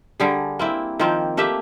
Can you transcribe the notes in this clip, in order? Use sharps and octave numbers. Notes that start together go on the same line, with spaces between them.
D3 G3 G#4
A#3 C4 E4
D#3 F3 A#3 C4
A3 A#3 G4 E5